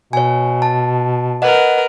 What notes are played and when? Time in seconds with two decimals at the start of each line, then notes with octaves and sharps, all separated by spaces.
0.13 B2 C#5 G#5
0.62 A5
1.42 A#4 B4 D#5 F#5